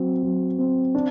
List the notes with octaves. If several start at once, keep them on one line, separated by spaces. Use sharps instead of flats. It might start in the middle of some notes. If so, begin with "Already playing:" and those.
Already playing: F#3 C4
F#3
C4
D4